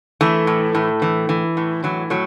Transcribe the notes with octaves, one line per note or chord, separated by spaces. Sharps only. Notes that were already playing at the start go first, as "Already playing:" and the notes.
E3 A3
A2
A2
E3
E3
A2
E3 F#3
A2 F#3